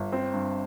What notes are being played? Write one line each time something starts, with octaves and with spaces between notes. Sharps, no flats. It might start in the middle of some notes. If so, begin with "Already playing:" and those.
Already playing: G1
C4
G2